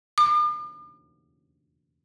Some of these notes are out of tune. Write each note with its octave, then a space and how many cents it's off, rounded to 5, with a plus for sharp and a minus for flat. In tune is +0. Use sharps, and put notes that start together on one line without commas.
D6 +45